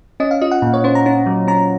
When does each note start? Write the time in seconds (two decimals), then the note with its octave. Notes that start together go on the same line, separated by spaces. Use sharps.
0.20 C#4 D#5
0.31 F5
0.41 F4 D#5
0.51 F#5
0.62 A#2
0.74 C#5
0.84 C#4 C5
0.95 A#5
1.06 C#4
1.26 F#3
1.48 C#4 A#5